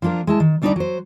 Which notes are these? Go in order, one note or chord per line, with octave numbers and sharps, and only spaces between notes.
F3 A#3 D4 F4 A#4
G#3 E4 A5
D#3
D2 G3 D4 D#4 B4 D5
F#3 C5